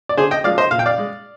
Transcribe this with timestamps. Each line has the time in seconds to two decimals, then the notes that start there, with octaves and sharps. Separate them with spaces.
0.09 D5
0.17 D3 G#4 C5
0.31 D#5 G5
0.44 F3 G#3 D5 F5
0.58 C5 D#5
0.71 A#2 F5
0.79 G5
0.86 D5 F5
0.98 G#3